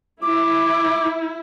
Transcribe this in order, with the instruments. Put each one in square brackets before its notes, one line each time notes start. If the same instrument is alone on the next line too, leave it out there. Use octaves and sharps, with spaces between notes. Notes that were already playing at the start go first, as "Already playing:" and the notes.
[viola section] E4 [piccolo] D6